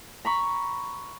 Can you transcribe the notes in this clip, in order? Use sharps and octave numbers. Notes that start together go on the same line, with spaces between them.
A#5 B5 C#6